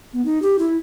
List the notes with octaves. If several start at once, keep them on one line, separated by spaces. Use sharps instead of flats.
B3
D#4
G4
E4